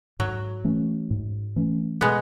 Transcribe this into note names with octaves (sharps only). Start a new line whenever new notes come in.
G#2 F#3
E3 A3 C#4
G#2
E3 A3 C#4
B2 G#3 B3